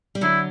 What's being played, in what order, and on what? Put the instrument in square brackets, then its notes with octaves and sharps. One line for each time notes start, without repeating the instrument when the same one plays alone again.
[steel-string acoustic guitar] G3
[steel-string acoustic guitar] D3 F#3 [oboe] E4